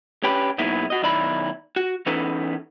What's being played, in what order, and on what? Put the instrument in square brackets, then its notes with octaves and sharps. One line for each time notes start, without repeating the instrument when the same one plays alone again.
[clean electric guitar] C#4 G4 B4
F#2 B2 A#3 B3 D#4 E4
F#4 D#5
B1 D#3 E4 D5 B5
F#4
E3 B3 C#4 D#4 A4 B4